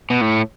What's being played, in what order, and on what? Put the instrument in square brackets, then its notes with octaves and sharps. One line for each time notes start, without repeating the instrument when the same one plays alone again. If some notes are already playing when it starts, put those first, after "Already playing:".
[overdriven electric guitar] B2
A2